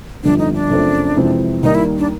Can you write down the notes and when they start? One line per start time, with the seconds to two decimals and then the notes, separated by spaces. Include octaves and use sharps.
0.23 G1 F2 D3 G3 B3 D4
0.38 D#4
0.54 D4
0.70 F#2 C#3 F3 A3 C4
1.17 F2 C3 E3 G#3 C4
1.63 D#2 D#3 G3 A#3 D#4
1.75 E4
1.98 D4